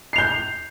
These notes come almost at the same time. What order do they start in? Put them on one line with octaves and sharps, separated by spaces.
C7 F7 G6